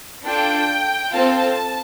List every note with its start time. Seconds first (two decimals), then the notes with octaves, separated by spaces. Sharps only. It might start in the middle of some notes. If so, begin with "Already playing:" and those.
0.24 D4 F4 A4 G5
1.14 C4 F4 A4 A5